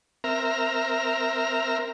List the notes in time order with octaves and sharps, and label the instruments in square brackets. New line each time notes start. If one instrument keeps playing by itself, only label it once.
[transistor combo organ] C4 A#4 E5 A#5 F6